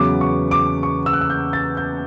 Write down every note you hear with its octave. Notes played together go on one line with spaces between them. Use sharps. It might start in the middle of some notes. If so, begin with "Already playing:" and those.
Already playing: E2 C#3 F#3 B3 D6
C#6
D6
C#6
E6
F#6
E6
G6
A6
G6